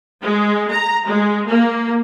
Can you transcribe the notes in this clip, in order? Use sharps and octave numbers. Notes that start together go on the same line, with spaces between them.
G#3
A#5
G#3
A#3